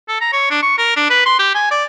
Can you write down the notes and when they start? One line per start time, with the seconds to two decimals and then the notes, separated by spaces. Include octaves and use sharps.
0.09 A4
0.21 A#5
0.33 C#5
0.51 D4
0.62 C#6
0.78 A#4
0.97 D4
1.10 B4
1.26 C6
1.39 G4
1.55 G#5
1.71 D5